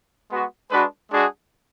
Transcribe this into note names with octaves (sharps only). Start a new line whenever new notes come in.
G#3 B3 F#4
G#3 D4 F#4 B4
G#3 D4 F#4 G#4